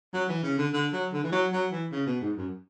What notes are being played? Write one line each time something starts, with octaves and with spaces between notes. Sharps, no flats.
F#3
E3
C#3
D3
D3
F#3
D3
E3
F#3
F#3
E3
C#3
B2
G#2
F#2